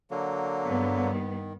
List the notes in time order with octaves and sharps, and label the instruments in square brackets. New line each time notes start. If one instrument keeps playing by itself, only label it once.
[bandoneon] D3 F#3 A#3
[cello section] G2 B3
[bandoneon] D#3